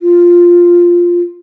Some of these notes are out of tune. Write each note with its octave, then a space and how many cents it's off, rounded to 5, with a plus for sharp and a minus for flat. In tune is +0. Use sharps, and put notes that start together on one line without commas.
F4 +0